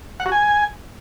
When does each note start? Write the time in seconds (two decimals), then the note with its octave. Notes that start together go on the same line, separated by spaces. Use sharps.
0.20 F#5
0.26 F#4
0.32 G#5